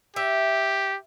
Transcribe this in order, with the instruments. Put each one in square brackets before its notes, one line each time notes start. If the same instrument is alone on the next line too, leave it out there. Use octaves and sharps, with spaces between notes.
[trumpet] G4 [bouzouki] E5